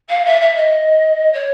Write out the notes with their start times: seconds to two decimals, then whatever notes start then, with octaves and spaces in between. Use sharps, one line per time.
0.09 F5
0.25 E5
0.41 E5
0.55 D#5
1.32 C#5